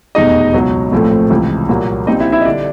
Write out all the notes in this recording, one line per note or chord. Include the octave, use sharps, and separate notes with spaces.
F1 E2 B2 G#3 D#4 D#5
C#2 B2 F#3
A#1 A2 F3 A3 C4
C#2 C3 E3
C2 A#2 F#3 A#3
A#1 A#2 G3 C4 D#4 D#5
E4 E5
E4 E5
D#5
D3 G3 D4 D5